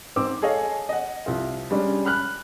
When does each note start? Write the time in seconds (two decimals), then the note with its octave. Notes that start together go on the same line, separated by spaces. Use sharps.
0.16 G#2 C4 D6 E6
0.42 G#4 A4 C#5 D#5 F5 G#5
0.89 D#5 F#5
1.26 C2 F3 F4
1.71 G3 G#3 C#4 D4
2.05 B5 F6 F#6